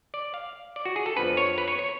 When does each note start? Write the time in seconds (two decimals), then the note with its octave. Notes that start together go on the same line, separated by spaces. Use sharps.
0.14 D5
0.34 F5
0.76 D5
0.85 F#4
0.96 G#4
1.06 A4
1.16 F2 F3 B3 D4 B4
1.37 C#5
1.58 B4
1.68 C#5
1.79 C#5